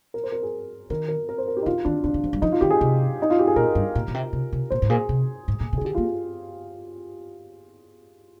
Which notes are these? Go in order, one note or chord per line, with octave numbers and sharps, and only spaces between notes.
A#4
C5
A#4
G#4
D#3 A#4
A#4
A#4
C5
A#4
G4
D#4
D3 F4
D#3 D4
D3 D4
D3
F3
G3
F3 D#4
F4
D#3 G4
G#4
C3
D#4
F4
G4
G#4
A#2 A#4
G2
A#2
A#2
C3
C3
C3
A#2 C5
G#2
A#2 G#4
C3
G#2
A#2
C3
G#4
D#3
D3 G4
A#3 F4
G#4